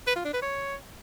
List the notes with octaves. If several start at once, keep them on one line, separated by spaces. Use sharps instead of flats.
B4
F4
D4
B4
C#5